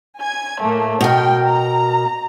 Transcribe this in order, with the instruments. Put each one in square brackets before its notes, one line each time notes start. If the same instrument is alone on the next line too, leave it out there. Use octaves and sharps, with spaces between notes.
[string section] G#5 G#6
A2 A3 A#3
[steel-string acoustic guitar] B2 A#4 [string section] G5
[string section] A#5